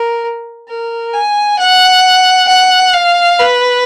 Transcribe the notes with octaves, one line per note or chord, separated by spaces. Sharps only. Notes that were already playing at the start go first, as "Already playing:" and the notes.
Already playing: A#4
A#4
G#5
F#5
F#5
F5
B4